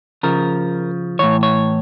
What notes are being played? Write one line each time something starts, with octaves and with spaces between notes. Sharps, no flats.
C#3 F3 A#4
A2 E3 C#5
C#5